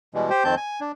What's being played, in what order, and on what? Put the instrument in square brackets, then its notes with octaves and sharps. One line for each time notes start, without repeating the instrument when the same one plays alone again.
[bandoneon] B2 E3 G3 G#3
G4 C5 G5
F2 D#3 C4 A5 G6
G#5
D4